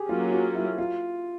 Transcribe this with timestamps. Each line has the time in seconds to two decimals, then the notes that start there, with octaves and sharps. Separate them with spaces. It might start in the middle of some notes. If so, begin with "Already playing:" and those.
Already playing: G4 G#4
0.09 F#3 A#3 C#4 F4
0.32 F4
0.55 E4
0.78 F4